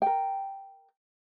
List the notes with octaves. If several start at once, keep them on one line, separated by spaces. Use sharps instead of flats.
A#4 G5